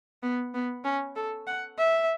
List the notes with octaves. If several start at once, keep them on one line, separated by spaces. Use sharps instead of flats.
B3
B3
C#4
A4
F#5
E5